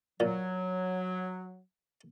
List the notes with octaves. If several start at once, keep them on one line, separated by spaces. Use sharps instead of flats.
A#2 F#3